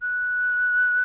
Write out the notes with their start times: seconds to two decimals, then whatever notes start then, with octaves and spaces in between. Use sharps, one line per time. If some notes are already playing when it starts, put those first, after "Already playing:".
0.02 F#6